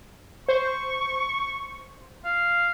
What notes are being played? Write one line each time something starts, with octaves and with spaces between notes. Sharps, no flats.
C5 C#6
F5